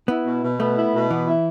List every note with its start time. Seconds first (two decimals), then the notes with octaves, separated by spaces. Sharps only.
0.08 B3 E4
0.25 B2
0.43 B2
0.60 A3 B3
0.77 E4
0.94 B2
1.10 E3 B3
1.27 E4